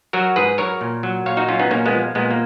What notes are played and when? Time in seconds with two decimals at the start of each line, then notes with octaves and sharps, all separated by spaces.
0.13 F#3 F#4 A#4
0.36 G#2 G#4 B4
0.58 F#3 A#4 C#5
0.81 A#2
1.03 F#3
1.26 A#2 C#5 F5
1.37 D#4 F#4
1.48 F#3 C#4 F4
1.59 B3 D#4
1.71 A#2 A#3 C#4
1.86 G#3 B3
1.93 F3
2.15 A#2 G#3 B3
2.31 A#3